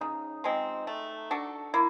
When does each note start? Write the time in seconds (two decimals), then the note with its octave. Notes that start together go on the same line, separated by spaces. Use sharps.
0.01 C#3 D#4
0.44 F3 G#3 C4
0.87 A3
1.31 D4 F#4 A4
1.74 A#3 E4